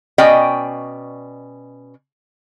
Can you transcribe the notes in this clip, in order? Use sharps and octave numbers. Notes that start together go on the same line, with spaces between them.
B2 C#4 D5 D#5 G5